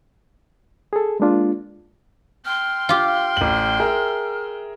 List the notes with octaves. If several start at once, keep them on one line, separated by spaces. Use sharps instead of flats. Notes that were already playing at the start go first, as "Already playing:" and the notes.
G#4 A4
G#3 A#3 D4 F4
G5 C6 F6
F4 G4
A1 F#7
G#4 A#4 E5